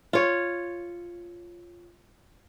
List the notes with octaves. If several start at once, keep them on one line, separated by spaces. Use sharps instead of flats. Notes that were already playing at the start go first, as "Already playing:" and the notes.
F4 C#5